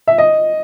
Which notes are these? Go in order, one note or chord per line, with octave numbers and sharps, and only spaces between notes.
E5
D#5